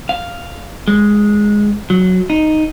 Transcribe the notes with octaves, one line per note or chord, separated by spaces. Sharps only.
F5
G#3
F#3
D#4